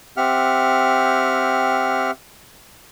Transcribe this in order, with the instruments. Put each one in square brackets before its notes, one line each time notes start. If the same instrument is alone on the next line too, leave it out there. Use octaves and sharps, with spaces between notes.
[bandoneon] C4 G4 E5 F#5 F6